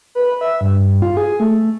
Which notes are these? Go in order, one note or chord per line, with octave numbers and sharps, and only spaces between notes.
B4
E5
G2
F4
G#4
A3